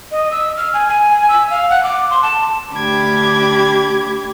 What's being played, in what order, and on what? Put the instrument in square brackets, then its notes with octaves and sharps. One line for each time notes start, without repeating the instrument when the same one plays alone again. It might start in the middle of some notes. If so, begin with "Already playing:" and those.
[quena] D#5
E6
F6
G#5
G#5
E6
F5
F#5
D6
C6
A5
[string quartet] D2 D4 G4 B5 D6 G#6